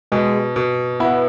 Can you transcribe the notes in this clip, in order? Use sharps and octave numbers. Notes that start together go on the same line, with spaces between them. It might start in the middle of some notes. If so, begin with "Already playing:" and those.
B2 G#3
B2
B3 E4